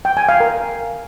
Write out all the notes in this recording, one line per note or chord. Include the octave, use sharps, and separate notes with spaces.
G5
G#5
F5
A#4